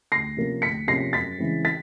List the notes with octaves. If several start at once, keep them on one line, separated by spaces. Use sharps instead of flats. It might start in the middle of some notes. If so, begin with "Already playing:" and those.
D2 A#6 C7
C3 F3 A#3 C#4
D2 B6 C#7
C3 F3 A#3 C#4 A#6 C7
F#2 A6 B6
C#3 E3 G#3 C4
A6 B6